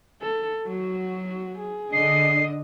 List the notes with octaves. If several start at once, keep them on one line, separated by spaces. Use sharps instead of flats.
A4
F#3 F#4
G#4
D3 D4 D#5 C7